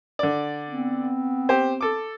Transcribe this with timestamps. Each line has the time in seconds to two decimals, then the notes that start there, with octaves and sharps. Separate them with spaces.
0.19 D3 D5
0.68 B3 C4
1.49 G4 C5
1.81 A4 D6